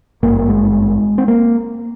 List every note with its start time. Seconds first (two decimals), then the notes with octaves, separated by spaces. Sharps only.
0.23 G#1 G2 A#3
0.38 A#3
0.48 G#3
1.18 C4
1.28 A#3